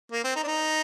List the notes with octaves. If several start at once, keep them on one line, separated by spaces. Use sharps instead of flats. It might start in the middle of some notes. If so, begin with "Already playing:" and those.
A#3
C4
D#4
D4
D#4